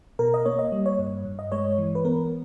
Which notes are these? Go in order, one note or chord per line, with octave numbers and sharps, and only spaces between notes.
B2 A#4
D#5
A#3 C#5
D#5
G3
C#5
G2
G2
D#5
G#3 C#5
E3
B4
B3 A#4